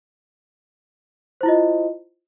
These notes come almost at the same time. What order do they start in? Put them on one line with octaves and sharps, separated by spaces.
C5 E4 F4 D#5